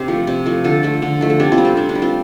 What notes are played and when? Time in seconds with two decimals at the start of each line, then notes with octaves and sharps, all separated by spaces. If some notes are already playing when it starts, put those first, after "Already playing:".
Already playing: C3 D4 G4 C5
0.08 F3 A3
0.27 C3
0.46 F3 A3
0.64 D3 F4 A4
0.83 F3 A3
1.02 D3
1.21 F3 A3
1.30 A4
1.40 C3 D4 G4
1.52 C4 F4
1.58 G3
1.65 C4
1.77 C3 D4
1.89 D4
1.95 G3
2.02 C4 F4